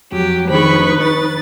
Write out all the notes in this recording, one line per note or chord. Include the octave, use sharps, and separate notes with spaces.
F2 F#3 G4
D#3 D4 D#4 B4 B5 C#6
A6